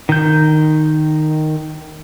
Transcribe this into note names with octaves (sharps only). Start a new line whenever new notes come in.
D#3 G6